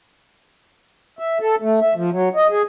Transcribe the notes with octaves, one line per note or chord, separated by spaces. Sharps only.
E5
A4
A3
E5
F3
F#3
D#5
G#4